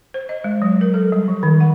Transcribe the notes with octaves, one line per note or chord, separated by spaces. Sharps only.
C5
D#5
G#3
F#3
A#4
A4
G3
F3
D#3
F#5